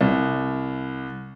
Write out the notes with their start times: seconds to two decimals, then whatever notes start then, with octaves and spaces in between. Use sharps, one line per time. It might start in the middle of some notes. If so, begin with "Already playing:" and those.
0.01 C2